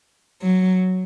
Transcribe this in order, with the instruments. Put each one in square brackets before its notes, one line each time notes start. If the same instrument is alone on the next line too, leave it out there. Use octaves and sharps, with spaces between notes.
[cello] F#3